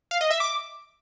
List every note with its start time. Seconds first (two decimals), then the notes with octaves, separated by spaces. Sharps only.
0.11 F5
0.21 D#5
0.31 E5
0.40 D6